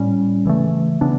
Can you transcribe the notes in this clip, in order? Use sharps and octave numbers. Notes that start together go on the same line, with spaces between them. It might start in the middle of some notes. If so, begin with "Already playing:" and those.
Already playing: A2 G3 C#4
C#3 E3 A3
C#3 E3 B3 D4